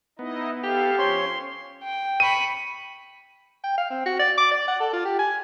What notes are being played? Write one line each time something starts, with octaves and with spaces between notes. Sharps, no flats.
B3 D#4 E4 D#5
G4 A4 F5
F3 C#4 C5 C#5 C6
G5
B5 C#6 D#7
G5
F5
C4
F#4
D5
D6
D5
F#5
A4
F4
G4
G#5